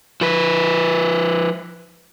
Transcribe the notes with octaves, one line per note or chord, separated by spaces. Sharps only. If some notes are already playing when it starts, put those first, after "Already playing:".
F3 B4